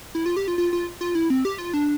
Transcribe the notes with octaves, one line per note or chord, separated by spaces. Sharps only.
E4
F4
G4
F4
F4
F4
F4
E4
C4
G4
F4
D4